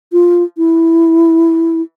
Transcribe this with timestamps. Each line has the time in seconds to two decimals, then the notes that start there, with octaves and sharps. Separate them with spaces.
0.12 F4
0.58 E4